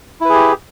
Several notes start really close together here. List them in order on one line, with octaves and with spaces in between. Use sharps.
E4 B4 G#4 G4